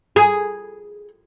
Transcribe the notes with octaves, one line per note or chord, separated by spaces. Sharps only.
G#4